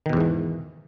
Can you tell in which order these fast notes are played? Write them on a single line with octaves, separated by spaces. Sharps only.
D#3 B2 E2 G#2 E3